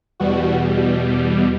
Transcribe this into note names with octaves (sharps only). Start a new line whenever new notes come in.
E2 B2 G3 F#4